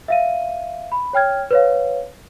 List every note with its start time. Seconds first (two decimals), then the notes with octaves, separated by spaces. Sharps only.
0.08 E5 F5 D#7
0.92 B5
1.13 C#5 G5 F6 G#6
1.51 B4 C#5 F5